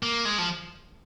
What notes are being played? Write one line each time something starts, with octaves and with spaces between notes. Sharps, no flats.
A#3
G#3
F3